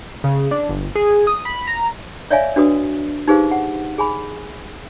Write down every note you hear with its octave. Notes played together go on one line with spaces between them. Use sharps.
C#3
D4
G1
G#4
D#6
B5
A#5
C#5 D5 E5 F5 G#5
D4 F#4 B4 D#6
D#4 G4 G#4 B4 C5 F5
F#5
G#4 G#5 B5